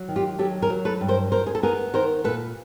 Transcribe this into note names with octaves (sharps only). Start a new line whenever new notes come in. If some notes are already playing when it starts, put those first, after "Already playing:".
Already playing: F#3
D#3
F4 G4
F#3 G4 A4
G#4 A#4
F#3
A4 B4
G2
A#4 C5
G2 A#4 C5
G#4
A4
B3 G#4 A#4
D#3 A#4 C5
A#2 A4 B4